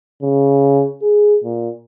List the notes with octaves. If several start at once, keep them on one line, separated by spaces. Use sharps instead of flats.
C#3
G#4
A#2